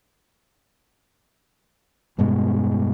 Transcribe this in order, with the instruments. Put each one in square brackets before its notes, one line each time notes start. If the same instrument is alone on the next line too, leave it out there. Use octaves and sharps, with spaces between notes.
[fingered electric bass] E1 G2 B2 G#3